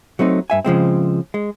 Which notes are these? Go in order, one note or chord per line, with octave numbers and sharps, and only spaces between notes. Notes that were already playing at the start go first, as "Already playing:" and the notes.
F#3 A3 C4 D#4
G2 E5 G#5
C#3 F3 G#3 C4
G#3